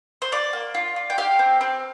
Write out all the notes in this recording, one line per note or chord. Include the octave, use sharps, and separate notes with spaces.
C5
F4 D5
A#3
F4
F4
G5
G4 F5
C4
C4